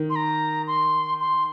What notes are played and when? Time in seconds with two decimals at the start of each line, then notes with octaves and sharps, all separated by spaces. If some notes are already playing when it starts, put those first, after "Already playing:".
Already playing: D#3
0.10 C6
0.16 A#5
0.67 C6
1.20 C6